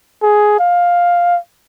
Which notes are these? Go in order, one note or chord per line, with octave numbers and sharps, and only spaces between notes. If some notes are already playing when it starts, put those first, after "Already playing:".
G#4
F5